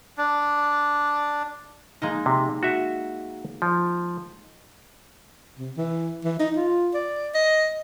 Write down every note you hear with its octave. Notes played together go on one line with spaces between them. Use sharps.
D4
G#3 A#3 D#4
C3
F#4 E5
F3
C3
E3
E3
D#4
F4
D5
D#5